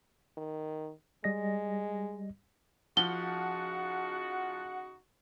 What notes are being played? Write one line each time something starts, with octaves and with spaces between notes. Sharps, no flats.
D#3
G3 G#3 D#5 A#6
C#3 F3 D#4 F#4 F#5 G7